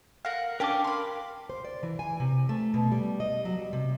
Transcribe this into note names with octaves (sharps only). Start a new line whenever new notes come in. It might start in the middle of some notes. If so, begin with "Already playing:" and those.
A#4 F5 F#5
C#4 D4 G4 A#4 D6
B5 C6
C5
D5
E3
G#5
C3
A3
B2
G3
D#5
F#3
G3
C3